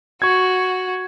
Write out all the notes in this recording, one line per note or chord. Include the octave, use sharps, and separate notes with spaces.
F#4 C#6 G#6